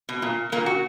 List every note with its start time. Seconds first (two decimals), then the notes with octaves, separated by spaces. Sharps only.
0.09 B2
0.22 A#2
0.52 A#2 A#3
0.66 F#4